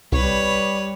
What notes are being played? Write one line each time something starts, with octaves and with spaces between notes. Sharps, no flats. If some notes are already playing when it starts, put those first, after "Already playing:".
C2 G3 B4 C#5